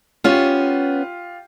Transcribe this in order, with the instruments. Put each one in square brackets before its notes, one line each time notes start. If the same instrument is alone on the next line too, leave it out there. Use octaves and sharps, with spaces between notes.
[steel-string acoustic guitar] B3 C#4 [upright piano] F4 G4